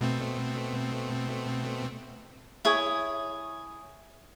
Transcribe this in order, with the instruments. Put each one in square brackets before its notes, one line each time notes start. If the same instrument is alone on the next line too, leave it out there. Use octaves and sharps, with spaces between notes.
[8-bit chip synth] B2 A3 C4
[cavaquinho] E4 G#4 C#5